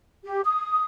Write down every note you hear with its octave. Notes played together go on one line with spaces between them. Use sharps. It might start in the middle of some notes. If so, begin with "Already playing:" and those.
G4
D#6